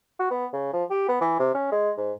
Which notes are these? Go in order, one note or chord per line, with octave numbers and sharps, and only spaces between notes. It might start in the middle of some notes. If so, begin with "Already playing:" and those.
F#4
B3
C#3
F3
G4
B3
E3
C3
C#4
G#3
G#2